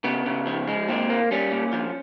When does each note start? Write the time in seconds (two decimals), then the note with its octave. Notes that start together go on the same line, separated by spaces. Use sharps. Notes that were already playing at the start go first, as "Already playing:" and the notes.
0.04 C#3 B3
0.26 C#3
0.47 F3
0.68 G#3
0.88 A#2 C4
1.10 A#3
1.31 G3 C#4
1.52 A#2
1.73 F3